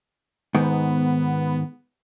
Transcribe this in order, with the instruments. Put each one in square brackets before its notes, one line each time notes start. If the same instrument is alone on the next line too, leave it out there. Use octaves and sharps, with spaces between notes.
[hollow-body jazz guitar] G#2 D#3 [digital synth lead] B3